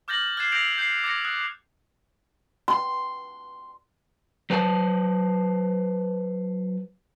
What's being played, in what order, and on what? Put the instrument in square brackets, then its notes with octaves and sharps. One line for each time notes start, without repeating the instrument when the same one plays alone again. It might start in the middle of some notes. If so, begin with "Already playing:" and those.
[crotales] D6 F6 G6 A6 A#6 F#7
F6 F#6 G#6 A6 C7 E7
E6 G6 A#6 C7 D7 F7
G6 C7
D6 G#6 A#6 C#7
D#6 F#6
[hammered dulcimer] C6
[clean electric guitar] F#3 B4 C5 G#5 A5